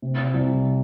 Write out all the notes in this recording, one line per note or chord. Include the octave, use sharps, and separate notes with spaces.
C3
C2